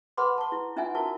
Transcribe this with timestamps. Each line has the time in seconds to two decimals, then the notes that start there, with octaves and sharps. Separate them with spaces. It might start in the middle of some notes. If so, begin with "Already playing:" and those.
0.17 B4 F#5 B5 C6 D6
0.38 A5 C#6
0.52 E4
0.76 C#4 D#4 F4 E5 F#5 G#5
0.95 E4 F#4 A#4 A5 C#6